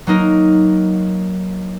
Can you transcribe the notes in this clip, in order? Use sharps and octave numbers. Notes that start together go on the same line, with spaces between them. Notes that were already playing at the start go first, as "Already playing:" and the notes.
F#3 A#3 D#4 A#4